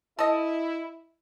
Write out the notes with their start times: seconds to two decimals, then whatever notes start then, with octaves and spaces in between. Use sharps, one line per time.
0.19 E4 A4 D#5